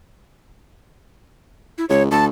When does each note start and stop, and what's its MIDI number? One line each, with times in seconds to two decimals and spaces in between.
1.78 1.85 64
1.90 2.09 37
1.90 2.03 73
2.11 2.29 38
2.11 2.25 81